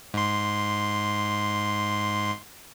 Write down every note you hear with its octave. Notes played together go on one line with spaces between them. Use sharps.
G#2 C6